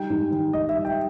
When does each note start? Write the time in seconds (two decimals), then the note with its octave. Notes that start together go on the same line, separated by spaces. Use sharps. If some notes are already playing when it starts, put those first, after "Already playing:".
Already playing: G3 D#4 G5
0.10 G#2
0.32 D#3
0.53 G#2 D#5
0.69 E5
0.75 G3
0.85 G5